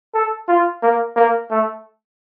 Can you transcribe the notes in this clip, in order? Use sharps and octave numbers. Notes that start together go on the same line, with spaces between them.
A4
F4
A#3
A#3
A3